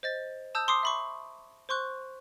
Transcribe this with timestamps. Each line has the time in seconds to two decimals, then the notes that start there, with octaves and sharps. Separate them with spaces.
0.03 C5 D#5 A6
0.55 A5 D#6 E6 G6
0.68 C6 D6 D#6 C7
0.83 E5 B5 C#6
1.69 C5 C6 C#6 F#6